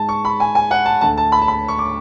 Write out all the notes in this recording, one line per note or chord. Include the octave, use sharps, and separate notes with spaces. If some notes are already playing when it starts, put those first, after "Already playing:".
Already playing: G#2 G#3 A5
C#6
B5
G#5
G#5
F#5
A5
D2 D3 A3 A5
A5
B5
A5
B5
C#6
D6